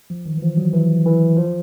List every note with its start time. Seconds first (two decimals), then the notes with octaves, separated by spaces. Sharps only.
0.10 F3
0.26 D#3
0.37 E3
0.42 F3
0.57 F#3
0.73 E3
1.05 E3
1.37 F3